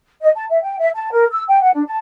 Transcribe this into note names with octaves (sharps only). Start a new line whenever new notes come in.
D#5
A5
E5
G5
E5
A5
A#4
E6
G5
F#5
D4
A5